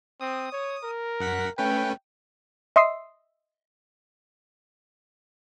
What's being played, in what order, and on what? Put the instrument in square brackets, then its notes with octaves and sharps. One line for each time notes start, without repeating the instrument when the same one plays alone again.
[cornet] C4 [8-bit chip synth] D#6
[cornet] C#5
A#4
[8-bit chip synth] F#2 F#5 B6
[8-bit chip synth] A3 C#4 B4 [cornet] G5
[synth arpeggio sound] D#5 E5 C6 D#6 E6 C7